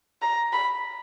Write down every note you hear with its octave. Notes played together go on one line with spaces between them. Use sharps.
A#5
B5